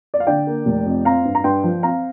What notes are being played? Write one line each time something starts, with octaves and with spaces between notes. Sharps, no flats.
D5
F5
D3 D5 G5
A#3
F1
F2
C4 F5 A#5
G2
A#5
G2 G5 C6
F3
C4 F5 A#5